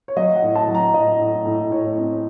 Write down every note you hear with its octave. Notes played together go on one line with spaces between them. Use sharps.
C#5
F#3 D#5
F#5
A2
A5
F#3
A#5
A2 D#5
A2
A2
A2 C#5
C4